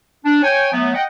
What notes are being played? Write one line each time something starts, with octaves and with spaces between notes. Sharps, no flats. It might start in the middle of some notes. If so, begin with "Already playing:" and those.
D4
C#5 G5 G#5
F#3 A3 B3
D#5 F#5 G5